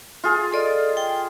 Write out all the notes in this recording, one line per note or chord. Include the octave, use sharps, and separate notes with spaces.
F4 G#4
A4 D5 D#5
G5